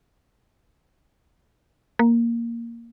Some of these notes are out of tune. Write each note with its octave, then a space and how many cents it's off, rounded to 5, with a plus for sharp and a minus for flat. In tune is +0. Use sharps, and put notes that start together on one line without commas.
A#3 +0